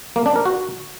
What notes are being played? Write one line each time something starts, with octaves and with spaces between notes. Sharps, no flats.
A#3
D4
A#4
F#4